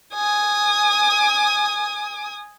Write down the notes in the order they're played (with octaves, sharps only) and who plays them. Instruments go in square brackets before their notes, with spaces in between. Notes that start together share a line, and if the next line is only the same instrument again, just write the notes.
[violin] G#5 D#6